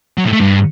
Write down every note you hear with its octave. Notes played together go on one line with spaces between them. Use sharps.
F#3
A2
A3
G2